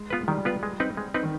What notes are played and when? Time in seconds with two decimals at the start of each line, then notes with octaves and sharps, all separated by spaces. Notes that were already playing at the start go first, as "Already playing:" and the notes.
Already playing: G#3
0.10 B3 F4 B4
0.28 D#3 G3
0.45 B3 F4 B4
0.63 G#3
0.80 C4 D#4 B4
0.97 G#3
1.14 C4 D#4 B4
1.23 D#3